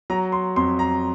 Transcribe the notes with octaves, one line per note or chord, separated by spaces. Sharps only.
F#3 A#5
C6
F2 C6
A#5